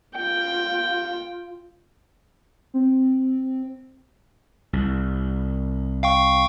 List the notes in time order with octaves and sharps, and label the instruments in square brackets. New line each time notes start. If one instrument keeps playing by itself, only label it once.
[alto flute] F4 [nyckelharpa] G5
[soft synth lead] C4
[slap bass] C2
[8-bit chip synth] F5 G5 C#6